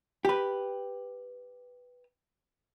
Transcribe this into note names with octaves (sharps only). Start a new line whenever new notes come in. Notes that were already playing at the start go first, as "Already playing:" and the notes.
G4 B4